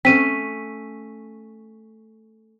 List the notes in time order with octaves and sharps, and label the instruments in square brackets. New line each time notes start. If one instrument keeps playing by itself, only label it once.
[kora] A3 C#4 E5 [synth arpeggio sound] C4 [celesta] B6 D#7